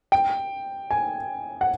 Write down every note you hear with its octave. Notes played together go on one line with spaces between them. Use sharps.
G5
G#5
F#5